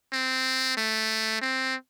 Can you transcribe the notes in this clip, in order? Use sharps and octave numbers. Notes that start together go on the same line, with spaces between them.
C4
A3
C4